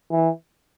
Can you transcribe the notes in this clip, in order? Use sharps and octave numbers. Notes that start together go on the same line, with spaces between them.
E3